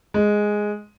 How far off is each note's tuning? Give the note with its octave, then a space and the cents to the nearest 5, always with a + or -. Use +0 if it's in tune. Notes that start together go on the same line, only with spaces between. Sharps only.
G#3 +0